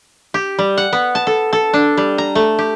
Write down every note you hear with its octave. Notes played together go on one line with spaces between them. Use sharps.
G4
G3
F#5
B3
A5
A4
A4
D4
G3
A#5
A3
G4